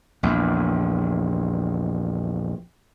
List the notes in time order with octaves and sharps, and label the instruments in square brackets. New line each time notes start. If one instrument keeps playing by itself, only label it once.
[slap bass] A#1 E2